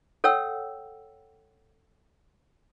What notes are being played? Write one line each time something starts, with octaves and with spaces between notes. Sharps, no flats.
A4 C#5 F#5 G5 E6